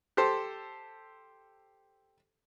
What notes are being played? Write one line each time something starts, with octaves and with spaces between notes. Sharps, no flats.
G4 A4 C5